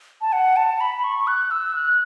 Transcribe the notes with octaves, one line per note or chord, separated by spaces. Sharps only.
A5
F#5
A5
B5
C#6
F#6
E6
F#6